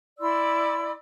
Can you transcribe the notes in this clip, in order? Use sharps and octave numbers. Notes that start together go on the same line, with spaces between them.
E4 D5 C6 E6